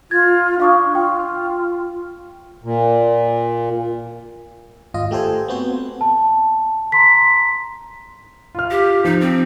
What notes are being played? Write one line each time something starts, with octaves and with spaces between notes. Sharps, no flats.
F4 G#6 A6
D4 F5 C#6 D#6
F4 G5 C#6
A#2
G#1 F4 D#5
A3 G4 A4 C5 G#5
B3 C4 F#4 C5
A5
A#5 C6 B6
F4 F6
G4
F3 D#4
C4